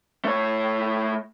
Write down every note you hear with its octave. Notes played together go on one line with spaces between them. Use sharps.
A3 C#5